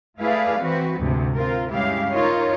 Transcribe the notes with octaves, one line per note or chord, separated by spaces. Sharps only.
A3 E4 G#4 B4 D5 F5
E3 C4 F#4 B4
D2 G#2 C3
C4 F4 A#4
G2 C#3 G#3 E4 G4 F5
D#4 F4 A#4 C#5